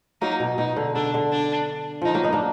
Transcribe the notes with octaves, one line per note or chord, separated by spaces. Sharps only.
F#3 A#3 D#4
B2
B2 D#4
D3
D3 D4
D3
D4
D#3 F3 D#4
F#3 A#3
B3 D#4
A#3 D4